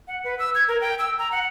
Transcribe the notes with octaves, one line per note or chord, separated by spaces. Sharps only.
F#5
B4
E6
G#6
A#4
G5
E6
A#5
F#5